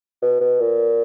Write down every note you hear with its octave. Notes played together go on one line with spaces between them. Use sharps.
B2
B2
A#2